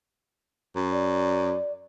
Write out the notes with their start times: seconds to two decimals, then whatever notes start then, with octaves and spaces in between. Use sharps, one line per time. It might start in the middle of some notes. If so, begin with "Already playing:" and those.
0.76 F#2
0.91 D5